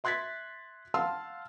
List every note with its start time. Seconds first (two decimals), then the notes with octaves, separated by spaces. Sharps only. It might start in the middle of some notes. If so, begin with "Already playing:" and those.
0.04 E5 C6 F#6 G#6 A6 B6
0.94 F5 F#5 A5 C6 E6 F6